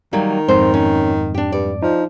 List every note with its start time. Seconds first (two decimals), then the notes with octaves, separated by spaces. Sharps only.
0.13 D#3 F#3 G3 A#3
0.48 F2 G#2 C5
0.74 C#4
1.34 D4 G4
1.52 G2 D5
1.82 F3 D#4